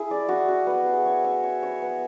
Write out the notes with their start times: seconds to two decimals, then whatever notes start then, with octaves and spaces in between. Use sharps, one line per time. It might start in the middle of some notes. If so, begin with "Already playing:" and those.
Already playing: E4 G#4
0.11 D5
0.29 F#4
0.49 F#4
0.67 B3
0.86 G#4
1.06 C#5
1.24 E5
1.44 C#5
1.63 C#5
1.82 B3